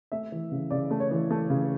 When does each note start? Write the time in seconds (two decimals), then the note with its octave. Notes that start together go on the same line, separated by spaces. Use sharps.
0.12 A3 E5
0.32 E3
0.52 C#3
0.71 C#3 D5
0.91 A3
1.00 C#5
1.11 E3
1.31 A3
1.50 C#3